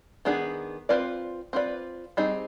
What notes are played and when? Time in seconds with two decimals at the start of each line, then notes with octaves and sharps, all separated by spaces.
0.25 D#3 B3 D4 G#4
0.89 C4 F4 B4 D5
1.53 C4 F4 B4 D5
2.17 G3 C4 D#4 G#4